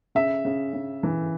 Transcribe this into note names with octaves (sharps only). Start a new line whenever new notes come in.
C#3 E5
C#3
C#3
E3